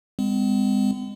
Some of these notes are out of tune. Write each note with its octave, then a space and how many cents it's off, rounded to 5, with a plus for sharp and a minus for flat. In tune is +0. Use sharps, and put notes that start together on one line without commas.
G#3 -35 C4 -45